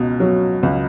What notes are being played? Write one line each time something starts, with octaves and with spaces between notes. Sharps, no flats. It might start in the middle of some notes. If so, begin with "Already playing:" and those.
Already playing: C#2 B2
F#3
C#2